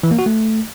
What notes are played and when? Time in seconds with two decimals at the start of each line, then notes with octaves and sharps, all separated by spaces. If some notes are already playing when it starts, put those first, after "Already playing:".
0.03 E3
0.11 A#3
0.19 F#4
0.26 A3